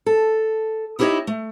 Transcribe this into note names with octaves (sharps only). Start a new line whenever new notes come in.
A4
D#4 E4 G4 B4 C#5 D#5
A3